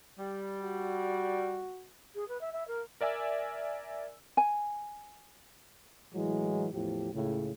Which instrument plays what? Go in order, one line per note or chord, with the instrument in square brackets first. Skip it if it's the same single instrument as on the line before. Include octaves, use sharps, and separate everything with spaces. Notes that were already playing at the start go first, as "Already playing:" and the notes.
[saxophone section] G3
[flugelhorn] F#4
[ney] G#4
B4
E5
E5
A#4
[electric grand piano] A#4 D5 E5 G#5 E6
[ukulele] G#5
[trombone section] A2 E3 F#3 G#3
E2 A2 F3 G4
C#2 A2 C#3